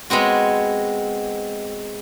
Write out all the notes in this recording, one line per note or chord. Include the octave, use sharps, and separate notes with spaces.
G#3 B3 C4 F#4